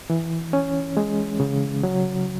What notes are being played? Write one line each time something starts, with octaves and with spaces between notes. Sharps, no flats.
E3
C#4
G#3
C#3
F#3